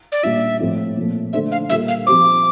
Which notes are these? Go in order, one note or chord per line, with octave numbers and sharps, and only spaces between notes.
D5
A#2 G3 D4 F4 E5
A2 F3 A3 C4 F4
A#2 F3 A3
D3 A3 D4 A4 C5 E5
F5
A#2 G3 A#3 F4 A4 E5
F5
F3 C4 G4 C5 D6